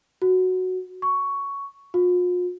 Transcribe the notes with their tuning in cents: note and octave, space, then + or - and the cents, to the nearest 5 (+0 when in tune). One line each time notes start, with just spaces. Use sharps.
F#4 +0
C#6 +10
F4 +45